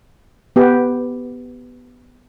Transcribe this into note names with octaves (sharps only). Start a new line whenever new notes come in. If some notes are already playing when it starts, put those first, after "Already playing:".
B3 G4